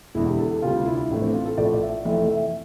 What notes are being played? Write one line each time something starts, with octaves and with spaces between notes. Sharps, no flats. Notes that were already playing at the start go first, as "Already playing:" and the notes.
E1 E2 D3 E4
G4
A4
D2 C3 G3 F4
D4
E4
A1 A2 F3 D4
C4
F4
A4
A#1 A2 F3 A3 D5
E5
F1 F2 E3 A3 E5
E5